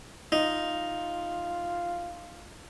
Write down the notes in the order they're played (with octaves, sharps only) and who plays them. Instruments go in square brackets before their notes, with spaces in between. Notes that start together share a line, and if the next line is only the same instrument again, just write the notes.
[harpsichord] D#4 [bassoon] F4